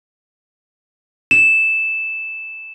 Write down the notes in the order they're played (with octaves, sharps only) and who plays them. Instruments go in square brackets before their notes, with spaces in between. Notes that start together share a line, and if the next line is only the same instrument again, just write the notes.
[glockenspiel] E7